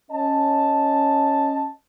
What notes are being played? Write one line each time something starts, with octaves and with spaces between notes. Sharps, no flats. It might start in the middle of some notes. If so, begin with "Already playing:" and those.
C#4 D#5 A5